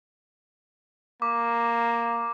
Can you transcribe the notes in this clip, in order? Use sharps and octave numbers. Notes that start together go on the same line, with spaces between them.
A#3 D6